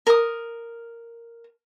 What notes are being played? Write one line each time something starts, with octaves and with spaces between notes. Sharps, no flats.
A#4 D#6